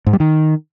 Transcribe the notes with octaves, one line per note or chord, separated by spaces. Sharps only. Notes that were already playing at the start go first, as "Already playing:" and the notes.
G#2
G3
D#3